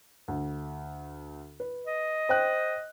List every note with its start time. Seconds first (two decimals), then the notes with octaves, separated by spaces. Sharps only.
0.28 D2
1.60 B4
1.87 D#5
2.29 C5 G5 F#6